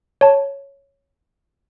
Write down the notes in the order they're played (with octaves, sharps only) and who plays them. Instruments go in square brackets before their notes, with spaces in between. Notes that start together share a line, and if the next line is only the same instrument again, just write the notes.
[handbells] C#5 A5